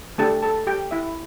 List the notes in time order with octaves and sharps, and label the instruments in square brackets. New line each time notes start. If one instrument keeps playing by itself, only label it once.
[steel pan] A3 D4 G4 A4 A5
A4 A5
G4 G5
E4 E5